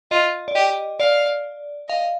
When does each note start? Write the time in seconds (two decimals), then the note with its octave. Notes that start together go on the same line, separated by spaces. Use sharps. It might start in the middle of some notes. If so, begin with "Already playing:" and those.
0.11 F4 D#5
0.48 D5
0.55 G4 D#5
1.00 D5 F5
1.89 D#5 F5